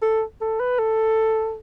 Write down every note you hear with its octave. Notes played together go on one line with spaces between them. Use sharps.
A4
A4
B4
A4